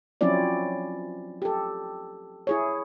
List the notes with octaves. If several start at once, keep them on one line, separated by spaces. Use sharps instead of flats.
F3 F#3 C4 C#4 E4 D5
G4 A4
E4 G#4 C#5